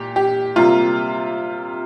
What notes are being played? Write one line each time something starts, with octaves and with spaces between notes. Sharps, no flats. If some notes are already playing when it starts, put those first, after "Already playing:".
Already playing: A#2 G4
G4
C3 G3 A#3 F4